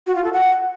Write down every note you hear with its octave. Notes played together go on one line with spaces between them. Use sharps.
F#4
F4
A4
F#5